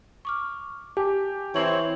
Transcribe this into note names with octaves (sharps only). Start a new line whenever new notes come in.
C#6 D6 F6
G4 G#5 A5 D6
E3 C4 C#5 A5 C#6 F#7